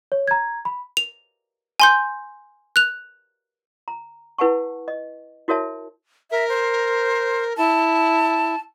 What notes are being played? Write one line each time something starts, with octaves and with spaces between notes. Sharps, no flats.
C#5
A#5 G#6
B5
F7
G#5 C6 G6
F#6 F7
A#5
E4 B4 F#5 G#5 A5 C#6
D#5
E4 F#4 A#4 C#5 E5 A5
A#4 E5
C5
E4 A5